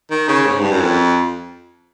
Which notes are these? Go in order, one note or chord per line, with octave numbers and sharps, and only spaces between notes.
D#3
C#3
G#2
G2
F#2
F2